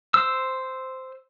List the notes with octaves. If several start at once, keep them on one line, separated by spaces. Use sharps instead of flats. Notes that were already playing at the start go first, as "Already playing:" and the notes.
C5 E6